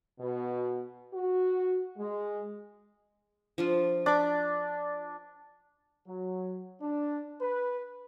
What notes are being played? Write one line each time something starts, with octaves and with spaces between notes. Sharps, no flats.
B2
F#4
G#3
F3 D4 F4
D4 B5 D6
F#3
D4
B4